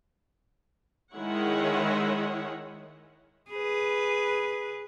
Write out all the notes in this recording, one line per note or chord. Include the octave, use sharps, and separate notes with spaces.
D#3 G#3 E4 G#4 C#5 F#5
G#4 B4